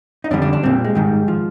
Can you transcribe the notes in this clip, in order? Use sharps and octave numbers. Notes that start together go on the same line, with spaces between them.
D#4
F2 D3 G3 D4
D4
D4
A#2 G3 C4
G#3
G#2 D#3 G3
F3